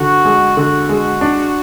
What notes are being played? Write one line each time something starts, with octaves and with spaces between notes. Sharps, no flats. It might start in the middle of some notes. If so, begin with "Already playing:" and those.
Already playing: D3 F#4
G#3
D3 F#4
G#3
D4